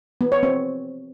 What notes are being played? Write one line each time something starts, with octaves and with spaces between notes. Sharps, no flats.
B3
C#5
C4